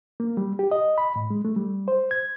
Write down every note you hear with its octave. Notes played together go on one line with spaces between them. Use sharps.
A#3
G3
G4
D#5
B5
A2
G#3
A3
G3
C5
G#6